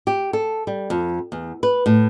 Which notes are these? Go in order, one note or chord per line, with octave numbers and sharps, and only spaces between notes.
G4
A4
G3
F2
E2
B4
A2